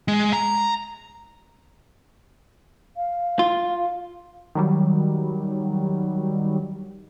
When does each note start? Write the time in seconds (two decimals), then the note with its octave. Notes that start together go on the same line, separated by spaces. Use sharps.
0.08 G#3
0.33 A#5
2.97 F5
3.39 F4
4.55 D#3 F#3 G3